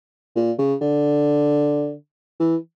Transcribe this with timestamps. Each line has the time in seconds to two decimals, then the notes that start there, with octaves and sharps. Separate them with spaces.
0.36 A#2
0.58 C#3
0.81 D3
2.40 E3